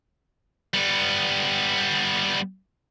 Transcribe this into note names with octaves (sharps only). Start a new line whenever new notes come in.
G3 B3